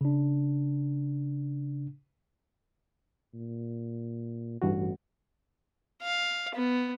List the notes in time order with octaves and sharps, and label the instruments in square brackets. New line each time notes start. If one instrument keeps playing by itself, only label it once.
[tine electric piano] C#3 D4
[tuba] A#2
[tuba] A1 [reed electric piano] G2 E3 F#4
[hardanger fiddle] F5
B3